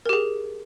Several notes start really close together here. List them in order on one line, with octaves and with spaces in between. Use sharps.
A#4 G4 G#4